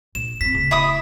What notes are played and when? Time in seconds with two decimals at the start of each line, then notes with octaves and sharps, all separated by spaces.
0.15 A#1 E7
0.41 G2 C4 B6
0.53 D1 C#3
0.71 E4 B5 D#6